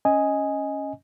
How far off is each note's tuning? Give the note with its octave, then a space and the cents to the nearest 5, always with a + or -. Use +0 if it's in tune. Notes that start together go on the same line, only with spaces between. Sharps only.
C#4 +0 D#5 +10 G#5 +0